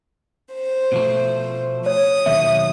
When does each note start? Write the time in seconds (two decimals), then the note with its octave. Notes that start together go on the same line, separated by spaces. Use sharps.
0.53 C5
0.92 B2 F3 A3
1.86 C#5 D#6
2.26 D#2 B2 F#3 E5